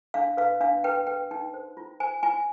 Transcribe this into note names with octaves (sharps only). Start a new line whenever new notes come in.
D4 F5
B4 F5
D4 F5
B4 G5
B4 G5
D#4 G5
C5
F4
C5 G#5
F4 G#5